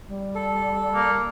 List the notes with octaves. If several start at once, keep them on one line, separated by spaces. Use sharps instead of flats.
G3
A4
A#3